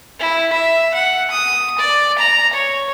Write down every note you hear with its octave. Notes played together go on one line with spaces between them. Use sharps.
E4
E5
F#5
D#6
D5
A#5
C#5